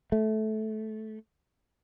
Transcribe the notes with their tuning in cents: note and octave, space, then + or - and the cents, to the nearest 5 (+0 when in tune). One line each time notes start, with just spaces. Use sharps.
A3 -15